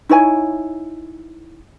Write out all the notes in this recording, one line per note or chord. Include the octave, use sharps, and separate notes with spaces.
D#4 E4 C#5 G#5